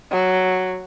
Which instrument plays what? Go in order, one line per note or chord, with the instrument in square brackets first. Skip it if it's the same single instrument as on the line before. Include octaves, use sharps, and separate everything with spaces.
[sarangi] F#3